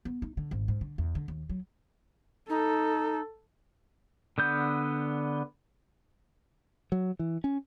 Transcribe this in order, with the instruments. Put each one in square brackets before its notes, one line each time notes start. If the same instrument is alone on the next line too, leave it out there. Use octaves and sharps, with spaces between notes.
[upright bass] B3
D#4
D3
G#1
G#2
D3
E2
D3
D#2
F#3
[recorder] D#4 [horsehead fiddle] A4
[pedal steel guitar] D3 B3 G6
[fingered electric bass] F#3
E3
C#4